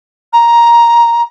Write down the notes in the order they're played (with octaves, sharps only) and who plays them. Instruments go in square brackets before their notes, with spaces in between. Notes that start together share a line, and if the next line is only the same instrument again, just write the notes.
[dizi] A#5